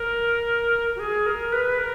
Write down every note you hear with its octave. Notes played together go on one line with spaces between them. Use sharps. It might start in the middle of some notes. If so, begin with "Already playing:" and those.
Already playing: A#4
F#4
G#4
A#4
B4
A#4